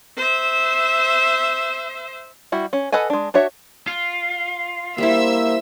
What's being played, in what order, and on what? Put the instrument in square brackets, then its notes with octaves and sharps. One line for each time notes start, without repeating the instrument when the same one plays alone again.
[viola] C5 E5
[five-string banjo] G3 E4 F#4
C#4
A4 B4 D#5 F#5 G#5
G#3 D4
D4 F#4 C#5 E5
[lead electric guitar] F4
[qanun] G3 E4 [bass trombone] A#3 [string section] C5 E5 E6